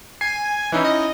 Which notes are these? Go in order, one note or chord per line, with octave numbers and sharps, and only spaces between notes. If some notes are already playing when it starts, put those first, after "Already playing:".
G#5 C7
E3 C#4 D#4 E4
D#5